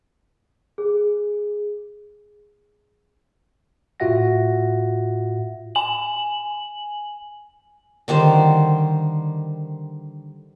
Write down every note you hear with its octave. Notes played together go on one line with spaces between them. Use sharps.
G#4
A2 F4 F#4 E5 F#5 A#6
G#5 F#7
D3 D#3 G3 C5